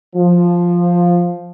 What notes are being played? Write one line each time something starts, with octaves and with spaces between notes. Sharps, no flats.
F3